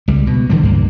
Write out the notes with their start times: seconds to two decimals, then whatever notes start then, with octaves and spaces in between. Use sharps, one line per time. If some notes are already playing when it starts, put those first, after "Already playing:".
0.08 C#2 G3
0.27 B2
0.50 D3 E3 F3 G3
0.63 C#2 G2 A#3